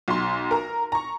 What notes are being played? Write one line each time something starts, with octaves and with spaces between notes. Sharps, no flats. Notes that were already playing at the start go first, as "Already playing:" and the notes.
B1 C6
A#4 A#5
A#5 C#6